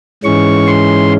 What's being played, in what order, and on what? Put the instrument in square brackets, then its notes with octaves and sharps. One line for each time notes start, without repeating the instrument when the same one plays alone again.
[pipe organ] G#2 E3 G#3 C#4 C#6
C6